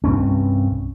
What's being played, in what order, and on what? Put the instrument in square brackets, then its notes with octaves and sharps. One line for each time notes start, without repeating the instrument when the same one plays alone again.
[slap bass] C2 G2 C4 C#4